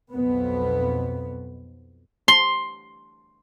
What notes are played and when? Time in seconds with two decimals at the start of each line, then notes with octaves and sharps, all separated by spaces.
0.13 B1 F2 B2 B3
2.28 C6